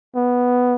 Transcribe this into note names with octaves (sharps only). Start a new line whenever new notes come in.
B3